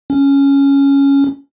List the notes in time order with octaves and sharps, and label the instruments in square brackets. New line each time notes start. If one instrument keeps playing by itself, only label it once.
[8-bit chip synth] C#4